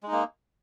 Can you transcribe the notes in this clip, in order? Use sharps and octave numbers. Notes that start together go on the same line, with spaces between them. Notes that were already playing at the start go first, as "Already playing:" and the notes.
G#3 A#3 D#4